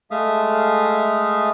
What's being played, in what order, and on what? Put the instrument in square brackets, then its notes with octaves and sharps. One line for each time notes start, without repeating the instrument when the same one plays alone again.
[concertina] G#3 A3 E5 F5 D#6